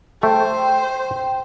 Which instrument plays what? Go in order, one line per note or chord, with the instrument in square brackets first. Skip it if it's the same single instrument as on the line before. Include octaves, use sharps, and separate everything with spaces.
[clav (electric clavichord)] A3 [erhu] C5 [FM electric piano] G5